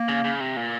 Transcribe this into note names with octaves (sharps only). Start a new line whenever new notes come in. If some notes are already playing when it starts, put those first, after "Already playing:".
Already playing: A#3
C#3
C#3
C3
A#2